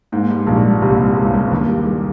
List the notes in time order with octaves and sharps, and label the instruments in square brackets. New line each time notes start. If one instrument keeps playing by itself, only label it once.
[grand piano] G#2 [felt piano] A#3
[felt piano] G2
[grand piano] A#1 A#2 [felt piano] G3
[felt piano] G2
[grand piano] C2 C3 [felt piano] A#3
[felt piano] G2
[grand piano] C#2 C#3 [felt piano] G3
[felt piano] G2
[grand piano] D#2 D#3 [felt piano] A#3
[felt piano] G2
G3